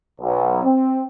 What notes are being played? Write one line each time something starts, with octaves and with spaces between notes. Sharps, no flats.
B1
C4